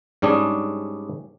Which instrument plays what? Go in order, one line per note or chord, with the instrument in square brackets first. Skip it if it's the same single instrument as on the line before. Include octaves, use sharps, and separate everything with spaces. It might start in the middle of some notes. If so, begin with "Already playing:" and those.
[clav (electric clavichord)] G#2 G3 C#4 D4 G#4